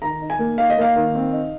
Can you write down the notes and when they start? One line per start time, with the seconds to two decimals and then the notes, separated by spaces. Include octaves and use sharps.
0.02 D#3 A#5
0.21 D#4
0.30 G#5
0.39 A#3
0.58 D#4 F5
0.70 D#5
0.77 A#3 F5
0.96 D#3
1.15 C4
1.33 D#4